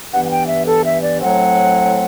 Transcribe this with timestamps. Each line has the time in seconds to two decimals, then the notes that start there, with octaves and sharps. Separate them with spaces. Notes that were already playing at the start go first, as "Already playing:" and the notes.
0.13 G2 E3 B3 F#5
0.25 F#5
0.31 G5
0.49 E5
0.67 A4
0.86 E5
1.03 D5
1.21 A2 F#3 A3 C4 F#5